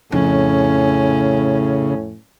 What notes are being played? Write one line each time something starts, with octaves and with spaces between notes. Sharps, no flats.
F2 A2 C#3 C#4